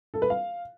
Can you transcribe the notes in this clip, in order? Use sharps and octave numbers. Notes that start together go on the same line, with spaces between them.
A4
B4
F5